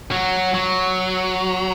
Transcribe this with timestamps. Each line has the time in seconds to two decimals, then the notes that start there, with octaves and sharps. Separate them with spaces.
0.12 F#3
0.54 F#3